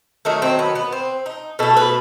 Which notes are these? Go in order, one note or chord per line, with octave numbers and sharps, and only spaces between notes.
D#3 F#3 A3
C4
B3
B3
C4
D#4
B2 A3 A4
B4